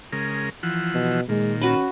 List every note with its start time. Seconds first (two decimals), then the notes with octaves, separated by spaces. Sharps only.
0.12 C#3 G#3 A#4
0.63 E3 F3 F#5
0.94 B2
1.29 A#2 D#3 G#3
1.61 C#4 F#4 B4 B5